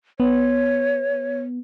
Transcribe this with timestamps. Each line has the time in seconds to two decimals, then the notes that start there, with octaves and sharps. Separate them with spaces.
0.20 B3 C#5